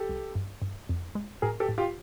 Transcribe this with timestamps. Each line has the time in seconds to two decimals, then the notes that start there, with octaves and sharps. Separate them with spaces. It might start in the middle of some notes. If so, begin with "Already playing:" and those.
Already playing: G4 A4
0.09 C2
0.35 G2
0.62 G2
0.89 F2
1.15 G#3
1.42 A2 G#4 A#4
1.60 G4 A4
1.69 A2
1.78 F4 G4